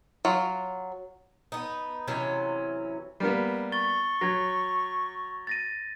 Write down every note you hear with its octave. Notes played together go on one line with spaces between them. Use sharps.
F#3 F4
B3 D#4
C3 E3 F#3 C#4
G3 A#3 B3
C#6 A6 G7
F#3 G#6 A#6
A6 A#6 D#7